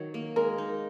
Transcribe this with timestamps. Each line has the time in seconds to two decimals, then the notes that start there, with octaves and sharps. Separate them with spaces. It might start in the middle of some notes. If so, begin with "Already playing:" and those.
Already playing: D#3 F#3 C#5
0.14 A#3
0.36 G#3 A#4
0.58 D#4